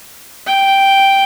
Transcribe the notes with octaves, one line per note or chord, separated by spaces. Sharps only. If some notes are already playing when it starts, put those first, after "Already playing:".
G5